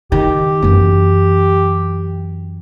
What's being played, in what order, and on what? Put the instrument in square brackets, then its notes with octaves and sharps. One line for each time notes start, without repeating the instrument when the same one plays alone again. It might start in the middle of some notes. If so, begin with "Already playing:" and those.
[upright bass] D#3 [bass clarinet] G4
[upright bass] F#2 E3